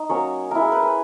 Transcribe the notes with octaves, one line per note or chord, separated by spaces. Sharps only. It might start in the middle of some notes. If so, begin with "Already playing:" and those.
Already playing: D#4 D#5
F#3 A#3 C#4 C#5
A#3 E4 A#4
G#4
B4
B4